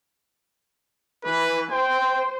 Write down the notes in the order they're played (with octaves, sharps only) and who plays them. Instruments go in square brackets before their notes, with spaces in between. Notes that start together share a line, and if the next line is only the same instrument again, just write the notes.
[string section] E3 [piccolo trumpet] B4
[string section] C5 [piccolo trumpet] G5